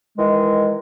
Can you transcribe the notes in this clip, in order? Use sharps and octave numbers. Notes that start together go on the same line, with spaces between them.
D#3 E3 G#3